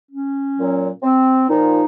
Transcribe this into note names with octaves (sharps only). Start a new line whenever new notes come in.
C#4
A#2 F#3
C4
A#2 F3 D#4